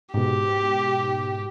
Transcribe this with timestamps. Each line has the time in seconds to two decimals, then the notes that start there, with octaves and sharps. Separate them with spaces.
0.14 G#2 B2 G4